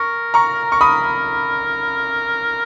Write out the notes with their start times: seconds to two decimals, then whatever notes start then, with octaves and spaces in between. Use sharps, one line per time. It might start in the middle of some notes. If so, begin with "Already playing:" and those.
Already playing: A#4 C#6
0.34 A#5 C#6
0.72 C#6
0.81 B5 D#6